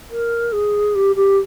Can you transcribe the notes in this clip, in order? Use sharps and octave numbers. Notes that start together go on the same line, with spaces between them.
A#4
G#4
G4
G4